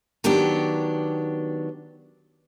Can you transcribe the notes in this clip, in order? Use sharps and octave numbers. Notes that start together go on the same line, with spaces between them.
D#3 F#3 B3 D4 G4